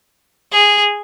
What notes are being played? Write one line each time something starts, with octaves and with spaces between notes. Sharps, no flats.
G#4